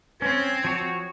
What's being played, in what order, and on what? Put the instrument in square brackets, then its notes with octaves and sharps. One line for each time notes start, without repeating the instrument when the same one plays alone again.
[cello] C4 [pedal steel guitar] C#4 [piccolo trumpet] G#6
[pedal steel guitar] F3 F#4 C#5